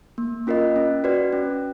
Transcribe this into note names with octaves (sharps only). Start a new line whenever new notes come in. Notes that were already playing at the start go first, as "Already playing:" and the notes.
A#3
C#4 F4 A#4 D#5
C#4
F#4 B4 D5
C#4